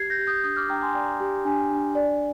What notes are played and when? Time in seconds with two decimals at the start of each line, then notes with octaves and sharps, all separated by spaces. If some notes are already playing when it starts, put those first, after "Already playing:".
Already playing: G4 G#6 C7
0.10 G6 A#6
0.19 G4
0.27 D#6 G6
0.44 D4 D#6 G6
0.56 D6 F6
0.69 D4 G5 A#5
0.82 G#5 C6
0.94 D5 G5 A#5
1.20 G4
1.45 D4 G#5
1.70 D4
1.95 D5